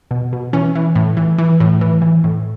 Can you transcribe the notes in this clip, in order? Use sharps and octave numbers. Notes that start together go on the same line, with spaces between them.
B2
B2
E3 C#4
E3
A2
E3
E3
A2
E3
E3
A2